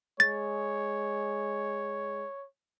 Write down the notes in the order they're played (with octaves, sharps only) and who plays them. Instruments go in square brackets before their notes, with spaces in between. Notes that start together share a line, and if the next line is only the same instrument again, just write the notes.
[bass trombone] G#3 [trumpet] C#5 [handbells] A6